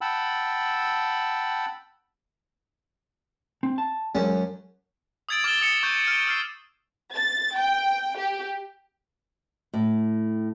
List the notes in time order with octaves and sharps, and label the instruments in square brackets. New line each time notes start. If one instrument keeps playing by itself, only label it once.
[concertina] F#5 G5 A5 B5 E6
[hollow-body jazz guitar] C4
A5
[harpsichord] F#2 C#4 A5 [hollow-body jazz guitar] G#3
[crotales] D#6 E6 G#6 A6 D7 F#7
D6 F6 G#6 A6 E7 G7
D#6 C#7 E7
C#6 G6 G#6 D#7
F6 D7 D#7
E6 F6 A6 C7
[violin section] A6
G5
G4
[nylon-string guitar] A2